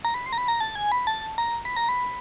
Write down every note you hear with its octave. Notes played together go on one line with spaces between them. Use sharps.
A#5
B5
C6
A#5
B5
A#5
A5
G#5
B5
A5
A#5
B5
A#5
B5